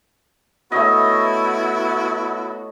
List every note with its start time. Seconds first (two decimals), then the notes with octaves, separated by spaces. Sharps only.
0.72 A3 B3 E4 F#4 C#5 D#5